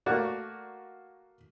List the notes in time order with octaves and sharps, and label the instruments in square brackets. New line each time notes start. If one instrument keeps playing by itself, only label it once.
[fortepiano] A3 A#3 F#4 D5